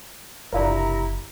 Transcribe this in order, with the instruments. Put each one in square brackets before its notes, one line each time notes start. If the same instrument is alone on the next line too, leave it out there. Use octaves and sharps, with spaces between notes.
[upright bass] F#1 [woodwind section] C3 E4 A#5 [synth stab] D4 F4 A#4